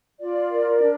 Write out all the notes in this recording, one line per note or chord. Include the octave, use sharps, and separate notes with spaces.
F4 D5
A#4
D4